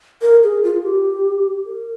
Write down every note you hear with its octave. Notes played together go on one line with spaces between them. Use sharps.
A#4
G#4
F4
G4
A#4